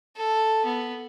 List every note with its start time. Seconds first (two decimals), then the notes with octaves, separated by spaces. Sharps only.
0.16 A4
0.65 B3